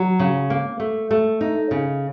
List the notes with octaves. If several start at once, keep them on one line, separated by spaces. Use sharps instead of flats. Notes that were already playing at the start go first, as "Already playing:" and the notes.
Already playing: F#3
C#3
A#3
A3
A3
D#4
C#3